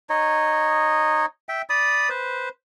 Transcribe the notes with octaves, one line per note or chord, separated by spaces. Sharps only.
D#4 C#5 D#5
E5 G5
D5 B5 D#6
B4 C5